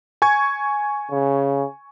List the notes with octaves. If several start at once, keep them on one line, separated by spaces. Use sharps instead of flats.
G#5 C#6 G#6
C#3